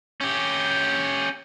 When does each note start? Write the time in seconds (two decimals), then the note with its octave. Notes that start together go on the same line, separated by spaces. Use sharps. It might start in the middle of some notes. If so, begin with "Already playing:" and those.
0.21 C#4 G4